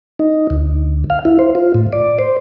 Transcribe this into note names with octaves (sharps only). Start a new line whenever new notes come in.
D#4
D2
F5
E4
C5
F4
A2
D5
C5